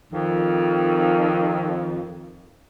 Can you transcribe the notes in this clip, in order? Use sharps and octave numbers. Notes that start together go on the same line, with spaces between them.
F2 D#3